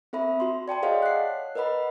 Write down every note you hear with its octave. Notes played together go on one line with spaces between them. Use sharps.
C4 A4 E5 B5
F#4 C6
D5 G5 A5 C6
G#4 A4 C#5 D#5 F5 F#5
F#6 C7
A#4 B4 D#5 F#5 B5